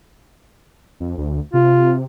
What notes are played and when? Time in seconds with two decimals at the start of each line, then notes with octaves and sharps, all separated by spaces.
1.00 F2
1.18 D2
1.54 C3 F4